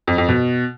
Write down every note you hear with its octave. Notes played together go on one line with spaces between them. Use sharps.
F2
F2
B2